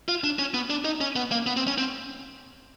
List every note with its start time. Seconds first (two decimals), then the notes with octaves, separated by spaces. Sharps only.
0.09 F4
0.24 D4
0.39 C#4
0.54 B3
0.70 D4
0.85 D#4
1.01 C#4
1.16 B3
1.32 A#3
1.46 B3
1.57 C4
1.67 C#4
1.78 C4